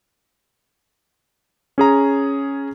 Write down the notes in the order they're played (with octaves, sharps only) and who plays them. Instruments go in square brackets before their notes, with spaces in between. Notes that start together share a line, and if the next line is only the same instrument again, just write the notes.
[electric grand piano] C#4 G#4 A#5